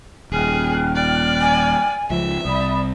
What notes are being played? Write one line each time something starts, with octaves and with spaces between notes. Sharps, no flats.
D#1 G#4 G5 F6 F#6
D5
G#5
C#2 F3 E5
C2 D5 B5 D#6